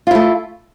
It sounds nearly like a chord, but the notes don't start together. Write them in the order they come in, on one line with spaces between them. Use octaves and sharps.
F4 E4 A3